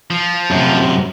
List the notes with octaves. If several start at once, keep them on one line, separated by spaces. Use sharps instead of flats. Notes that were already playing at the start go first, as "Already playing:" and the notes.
F3
F#2 C3